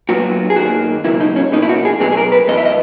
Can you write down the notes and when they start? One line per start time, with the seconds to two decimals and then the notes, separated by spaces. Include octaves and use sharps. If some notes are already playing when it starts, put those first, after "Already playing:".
0.09 A#2 F#3 B3 F#4
0.50 G#4
0.56 F#2 D#3 A#3 F#4
1.04 C#2 B2 F#3 A#3 E4
1.20 D#4
1.36 C#4
1.52 E2 B2 A#3 D#4
1.62 E4
1.69 F#4
1.85 G#4
2.00 B1 B2 F#3 B3 G#4
2.12 G#4
2.17 A#4
2.32 B4
2.48 F#2 E3 B3 D#5
2.57 E5
2.65 D#5